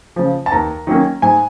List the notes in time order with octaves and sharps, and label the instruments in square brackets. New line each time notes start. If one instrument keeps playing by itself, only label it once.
[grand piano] C#3 F3
A5
D#2 A#5
D#3 F#3 A#3 C#4
G#2 G#5